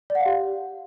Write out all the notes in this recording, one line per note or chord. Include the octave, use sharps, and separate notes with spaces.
D5
F#5
F5
G4